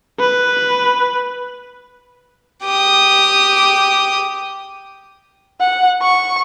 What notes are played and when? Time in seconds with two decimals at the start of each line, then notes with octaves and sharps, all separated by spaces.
0.20 B4
2.64 G4 D#6
5.60 F#5
6.02 C#6